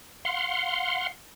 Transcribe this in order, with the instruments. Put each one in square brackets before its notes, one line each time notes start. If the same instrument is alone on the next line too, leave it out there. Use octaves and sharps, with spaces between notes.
[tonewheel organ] F5 F#5 C6